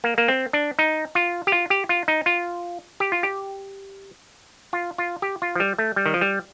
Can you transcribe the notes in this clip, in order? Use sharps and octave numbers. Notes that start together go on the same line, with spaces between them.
A#3
A#3
C4
D4
D#4
F4
G4
F4
G4
F4
D#4
F4
G4
F4
G4
F4
F4
G4
F4
F3
G3
A3
G3
D#3
F3
G3